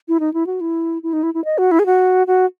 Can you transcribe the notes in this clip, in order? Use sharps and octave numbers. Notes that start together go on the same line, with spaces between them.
E4
D#4
E4
F#4
E4
E4
D#4
E4
E4
D#5
F#4
E4
G#4
F#4
F#4